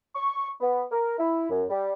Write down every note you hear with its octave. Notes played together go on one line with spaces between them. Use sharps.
C#6
B3
A#4
E4
F#2
G3